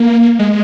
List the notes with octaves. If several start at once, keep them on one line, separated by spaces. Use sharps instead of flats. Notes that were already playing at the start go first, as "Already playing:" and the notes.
Already playing: A#3
G#3